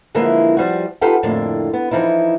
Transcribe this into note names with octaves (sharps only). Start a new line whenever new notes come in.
D3 E3 F3 G#3 A#3 E4
F3 G3 F#4
D#4 F4 G4 A4 B4 F#5
F2 A2 D3 A#3
B3
E3 F3 D#4 E4